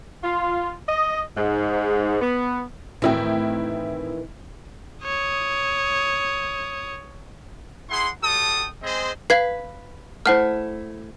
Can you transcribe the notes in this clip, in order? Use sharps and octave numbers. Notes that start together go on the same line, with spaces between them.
F4
D#5
G#2
B3
A2 D#3 E3 C4 E4 G5
C#5 D#6
E4 G#4 F#5 C6
G3 F#4 A4 G5 A5 D#6
G#3 C4 G#4 C5 D#5 C6
B4 F5 G#6 C7
A3 E4 C5 F#5 F6